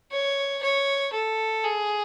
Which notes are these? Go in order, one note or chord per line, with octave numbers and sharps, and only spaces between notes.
C#5
C#5
A4
G#4